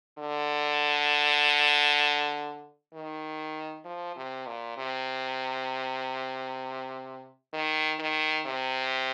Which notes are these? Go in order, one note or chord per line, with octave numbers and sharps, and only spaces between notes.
D3
D#3
F3
C3
A#2
C3
D#3
D#3
C3